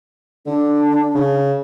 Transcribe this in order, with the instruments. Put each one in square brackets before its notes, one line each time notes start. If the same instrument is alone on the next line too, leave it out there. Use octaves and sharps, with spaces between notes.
[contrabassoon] D3 [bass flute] D4
[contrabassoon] C#3